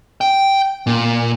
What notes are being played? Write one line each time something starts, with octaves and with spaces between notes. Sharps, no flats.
G5
A#2